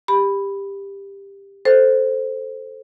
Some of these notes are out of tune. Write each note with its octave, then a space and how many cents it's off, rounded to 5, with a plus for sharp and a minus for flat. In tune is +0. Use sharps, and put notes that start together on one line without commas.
G4 +15 B5 +0
A4 +0 C5 +0